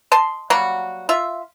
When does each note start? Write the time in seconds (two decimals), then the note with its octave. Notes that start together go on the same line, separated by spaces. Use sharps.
0.12 D#5 A5 C6
0.50 F#3 G3 A#3 F#4
1.09 F4 E5